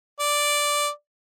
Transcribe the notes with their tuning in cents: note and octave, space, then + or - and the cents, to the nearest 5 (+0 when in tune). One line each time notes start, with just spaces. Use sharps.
D5 -5